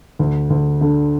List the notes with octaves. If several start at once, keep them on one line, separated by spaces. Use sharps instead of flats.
D2
D2
D3